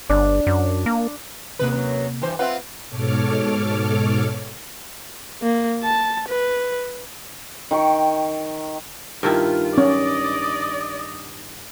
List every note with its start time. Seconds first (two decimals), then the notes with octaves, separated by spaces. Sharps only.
0.10 G1 D4
0.47 F#2
0.86 A#3
1.59 D#2 G#2 C3 G#3 A#3 B4
1.72 F#2 F#3
2.22 G2 E3 C5
2.39 C4 F4 B4 E5 F#5
2.89 G#2 B2 A4 C#5 D6 F6
5.42 A#3
5.83 A5
6.28 B4
7.71 D#3 G5 C#6
9.23 G2 D#3 E4 F4
9.78 C#4 D5 D#5